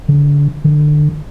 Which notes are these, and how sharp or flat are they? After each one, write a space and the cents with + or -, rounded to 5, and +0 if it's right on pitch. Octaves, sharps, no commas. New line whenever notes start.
D3 -30
D3 +25